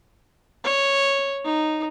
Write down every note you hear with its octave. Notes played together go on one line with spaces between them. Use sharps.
C#5
D#4